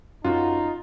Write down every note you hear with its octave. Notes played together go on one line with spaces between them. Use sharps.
F#2 D#4 F4 F#4